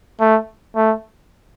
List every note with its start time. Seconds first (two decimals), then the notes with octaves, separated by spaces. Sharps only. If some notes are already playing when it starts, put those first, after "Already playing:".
0.21 A3
0.76 A3